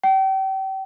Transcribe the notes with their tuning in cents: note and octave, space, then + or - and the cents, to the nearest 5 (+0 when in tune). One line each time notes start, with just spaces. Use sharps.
G5 -35